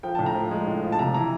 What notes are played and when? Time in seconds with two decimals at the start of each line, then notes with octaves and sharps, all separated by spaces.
0.03 F3 G5
0.15 A2 A5
0.26 A#5
0.34 F3
0.51 G#3
0.67 A2
0.83 F3
0.92 A5
0.99 C3 A#5
1.14 E3 A#5